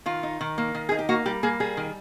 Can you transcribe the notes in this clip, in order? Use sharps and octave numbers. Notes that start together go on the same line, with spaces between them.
D#3 F4
D#4
D#3
A#3
D#3
D#4 G#4
G4
A#3 F#4
G3 G4
A#3 G#4
G3 G#4
D#3